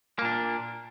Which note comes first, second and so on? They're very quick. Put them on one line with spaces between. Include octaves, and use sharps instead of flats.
A#3 A#2 D4